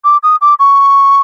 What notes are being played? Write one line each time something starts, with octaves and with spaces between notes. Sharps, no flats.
D6
D#6
D6
C#6